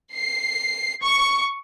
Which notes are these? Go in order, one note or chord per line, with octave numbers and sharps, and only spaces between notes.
C7
C#6